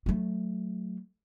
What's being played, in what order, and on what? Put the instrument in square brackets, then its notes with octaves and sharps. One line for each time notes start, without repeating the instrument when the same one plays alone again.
[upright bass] F#3 A3